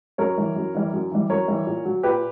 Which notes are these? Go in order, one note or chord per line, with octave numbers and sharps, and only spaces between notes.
F#2 A#4 C#5
E3 G3
F#2
E3 G3
F#2
E3 G3
F#2 A#4 C#5
E3 G3
A#2
F#3
A#2 G4 B4